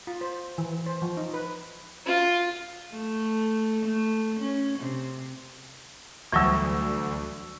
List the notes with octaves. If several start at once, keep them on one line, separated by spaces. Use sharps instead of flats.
F4
C5
E3
C5
F3
D#4
B4
F4
A3
A3
C#4
C3
D2 E3 F#3 G3 C#6 E6